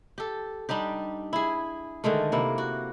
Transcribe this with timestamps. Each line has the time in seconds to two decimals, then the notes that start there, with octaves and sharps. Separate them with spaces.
0.18 G4 A4
0.69 G3 D4 D#4 G4
1.33 E4 G#4
2.04 D3 D#3 G#3 A3
2.32 C3 A#3 E4
2.58 F#4